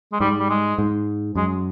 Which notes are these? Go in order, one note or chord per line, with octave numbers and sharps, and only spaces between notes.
G#3
G#2 G3
G3
G#3
G#2
F#2 G#3